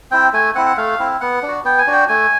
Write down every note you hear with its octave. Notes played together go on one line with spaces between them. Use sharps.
C4 E4 G5
A3 G#5
C4 E4 F#5
F#5
A3 F5
C4 E4
B3 F#5
D4
F#4
B3 G5
G#5
D4 F#4
G5
A3 G#5